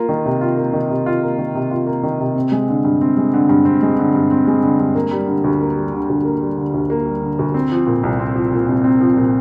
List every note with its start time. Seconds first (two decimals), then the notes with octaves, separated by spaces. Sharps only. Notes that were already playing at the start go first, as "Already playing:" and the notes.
Already playing: A#3 F4
0.09 D#3
0.26 C3
0.41 F4
0.57 A#3
0.73 D#3
0.90 C3
1.06 F4
1.22 A#3
1.38 D#3
1.55 C3
1.71 F4
1.87 A#3
2.03 D#3
2.20 C3
2.35 C4
2.52 G#3
2.68 D3
2.85 G2
3.01 C4
3.17 G#3
3.34 D3
3.49 G2
3.65 C4
3.82 G#3
3.98 D3
4.15 G2
4.31 C4
4.47 G#3
4.63 D3
4.79 G2
4.95 A#3
5.11 G3
5.27 D3
5.44 D2
5.61 A#3
5.76 G3
5.93 D3
6.09 D2
6.25 A#3
6.41 G3
6.58 D3
6.74 D2
6.90 A#3
7.06 G3
7.22 D3
7.39 D2
7.54 C4
7.72 F3
7.87 A#2
8.03 C2
8.20 C4
8.35 F3
8.53 A#2
8.69 C2
8.84 C4
9.01 F3
9.17 A#2